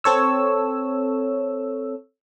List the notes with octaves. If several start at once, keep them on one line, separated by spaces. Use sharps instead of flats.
C4 A4 C#5 E6